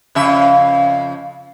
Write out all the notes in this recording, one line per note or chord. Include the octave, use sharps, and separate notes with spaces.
F2 C#3 E5